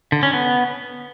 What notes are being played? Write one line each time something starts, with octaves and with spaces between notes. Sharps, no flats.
D3
C#4
B3